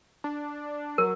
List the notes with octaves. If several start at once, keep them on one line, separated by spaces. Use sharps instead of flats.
D4
F#3 A#4